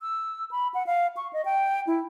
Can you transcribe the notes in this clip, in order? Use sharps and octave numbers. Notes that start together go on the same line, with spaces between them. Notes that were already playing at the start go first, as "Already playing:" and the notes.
E6
B5
F#5
F5
C#6
D#5
G5
E4